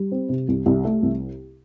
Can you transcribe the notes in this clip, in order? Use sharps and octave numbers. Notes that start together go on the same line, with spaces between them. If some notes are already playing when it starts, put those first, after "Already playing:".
Already playing: G3
C4
C3
C2
C2
A3
C2